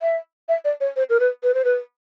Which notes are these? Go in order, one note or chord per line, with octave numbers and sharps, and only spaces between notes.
E5
E5
D5
C#5
C5
A#4
B4
B4
C5
B4